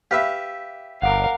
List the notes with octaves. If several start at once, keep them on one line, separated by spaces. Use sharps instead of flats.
G4 B4 E5 F5
G1 A#4 F5 F#5 D6